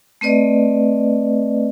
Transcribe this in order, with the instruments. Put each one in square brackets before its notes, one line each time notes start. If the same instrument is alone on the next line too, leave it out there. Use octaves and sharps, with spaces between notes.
[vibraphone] A3 C4 B4 D5 D#5